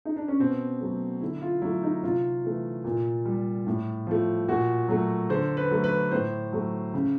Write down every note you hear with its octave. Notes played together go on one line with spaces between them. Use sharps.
D#4
D4
C#4
B2 C4
F#3 A3
D3 E4
F4
F#3 A3 E4
D#4
C3 F4
E3 A3
A#2
G3
A2
F3 A3
A#2 F#4
F#3 A3
D3 C5
B4
F#3 A3
B4
A2 C5
F#3 A3
C#3